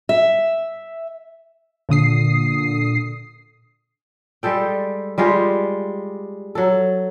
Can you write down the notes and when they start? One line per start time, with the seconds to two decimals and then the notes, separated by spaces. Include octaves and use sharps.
0.09 E5
1.89 A#2 D3 D#6 C7
4.43 G3 G#3 A4 G5
5.18 G3 G#3 F4 G4
6.55 F#3 A4